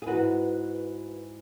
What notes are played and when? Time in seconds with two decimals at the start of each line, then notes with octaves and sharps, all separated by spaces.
0.02 G#4
0.06 G#2 E3 F#4 B4